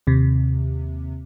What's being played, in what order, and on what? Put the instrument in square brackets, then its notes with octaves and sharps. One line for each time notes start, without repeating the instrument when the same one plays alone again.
[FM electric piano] D#2 C3